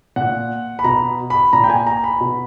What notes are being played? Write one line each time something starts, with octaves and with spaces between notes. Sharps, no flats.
A#2 F#5
B5
B2 A#5
B5
A#2 A#5
G5
G#5
A#5
B5
B2